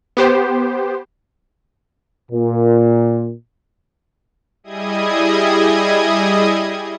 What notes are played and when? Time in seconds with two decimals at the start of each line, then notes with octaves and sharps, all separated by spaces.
0.17 B3 G4 C5
2.32 A#2
4.64 G3 E4 G#4 D#5 D#6 G#6